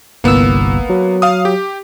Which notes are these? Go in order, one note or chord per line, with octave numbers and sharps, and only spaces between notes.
G1 C2 A#3 B3 E6
F#3
F5 D#6
G4